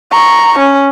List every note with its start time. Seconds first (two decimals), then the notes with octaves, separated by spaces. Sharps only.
0.11 A#5 C#6
0.59 C#4